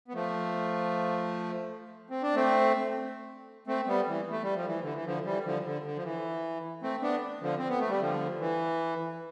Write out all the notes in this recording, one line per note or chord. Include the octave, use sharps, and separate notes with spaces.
B3
F3 A3
C4
D4
A3 C4
A3 C4
G3 B3
E3
A3
G3
F3
E3
D3
E3
D3 F3
E3 G3
D3 F3
D3
D3
F3
E3
A3 C4
B3 D4
D3 F3
C4
B3
A3
G3
D3 F3
E3